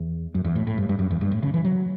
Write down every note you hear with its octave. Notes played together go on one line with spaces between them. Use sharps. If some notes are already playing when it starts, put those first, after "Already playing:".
Already playing: E2
F#2
E2
A2
A2
G2
G2
F#2
E2
G2
A2
C#3
E3
F#3